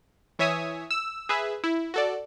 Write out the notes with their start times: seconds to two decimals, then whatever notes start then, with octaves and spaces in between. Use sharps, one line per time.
0.39 E3 C#5 E5 G#5 D#6
0.91 E6
1.29 G#4 B4 E5
1.64 E4
1.94 F#4 A4 D5